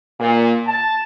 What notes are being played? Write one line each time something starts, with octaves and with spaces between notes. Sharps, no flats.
A#2
A5